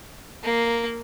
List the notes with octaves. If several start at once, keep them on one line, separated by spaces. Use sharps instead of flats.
A#3